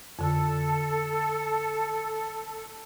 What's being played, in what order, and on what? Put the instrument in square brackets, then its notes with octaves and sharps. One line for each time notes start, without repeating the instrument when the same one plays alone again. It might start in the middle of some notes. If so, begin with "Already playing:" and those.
[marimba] F2 D3 [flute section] A4